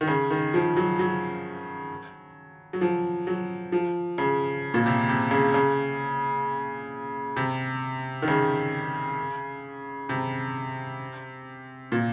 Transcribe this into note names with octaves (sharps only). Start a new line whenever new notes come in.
D#3
C#3
D#3
F3
F#3
F#3
F#3
F3
F#3
F3
C#3
A#2
C3
C3
C#3
C#3
C3
D#3
C#3
C3
A#2